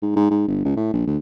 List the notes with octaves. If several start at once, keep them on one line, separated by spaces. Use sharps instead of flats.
G#2
G#2
G#2
G1
C#2
A2
A#1
D2